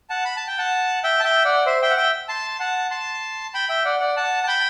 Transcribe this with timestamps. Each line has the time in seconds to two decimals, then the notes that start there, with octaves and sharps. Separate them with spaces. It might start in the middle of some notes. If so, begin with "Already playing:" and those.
0.10 F#5 A5
0.25 B5
0.36 A5
0.47 G5
0.58 F#5 A5
1.04 E5 G5
1.20 A5
1.24 E5 G5
1.45 D5 F#5
1.66 C5 E5
1.82 E5 G5
1.90 F#5
1.97 E5 G5
2.28 A5 C6
2.60 F#5 A5
2.91 A5 C6
3.54 G5 B5
3.69 E5 G5
3.85 D5 F#5
4.00 D5 F#5
4.16 F#5 A5
4.43 A5
4.47 G5 B5